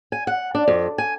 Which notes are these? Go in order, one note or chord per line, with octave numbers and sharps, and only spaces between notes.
G#5
F#5
D4
F2
G#5